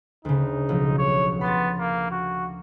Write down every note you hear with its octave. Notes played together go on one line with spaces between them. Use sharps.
D2 C#3 D#4
B1 F3
C#5
B3 B5 C6 A6
A#3
F#4